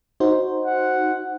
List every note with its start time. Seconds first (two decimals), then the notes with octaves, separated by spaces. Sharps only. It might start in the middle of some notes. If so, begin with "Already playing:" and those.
0.20 D#4 F#4 C5
0.65 F#5